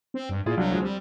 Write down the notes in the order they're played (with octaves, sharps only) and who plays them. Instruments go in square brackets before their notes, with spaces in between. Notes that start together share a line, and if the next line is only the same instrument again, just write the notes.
[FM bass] C4
G2
[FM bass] A#2 [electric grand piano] E4 F4 G#4
[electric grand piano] C2 D4 F5 [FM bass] F#3
[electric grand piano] D2 F3 G#3
[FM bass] G3 [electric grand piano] C4